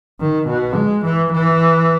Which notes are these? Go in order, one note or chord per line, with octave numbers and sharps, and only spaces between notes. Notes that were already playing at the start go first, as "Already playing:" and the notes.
D#3
B2
G#3
E3
E3